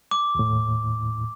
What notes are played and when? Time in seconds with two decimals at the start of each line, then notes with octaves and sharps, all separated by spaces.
0.11 D6
0.35 D#2 A2